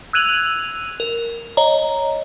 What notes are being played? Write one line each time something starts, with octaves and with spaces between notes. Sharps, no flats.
E6 F#6 G#6 D#7 F7 F#7
A#4
C#5 D#5 A#5